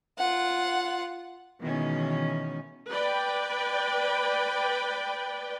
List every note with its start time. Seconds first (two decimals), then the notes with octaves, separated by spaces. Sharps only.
0.18 F4 F#5
1.60 B2 D#3 E3 G#3 C#4
2.90 B4 D5 G5